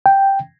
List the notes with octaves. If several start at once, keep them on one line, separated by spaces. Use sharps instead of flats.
G5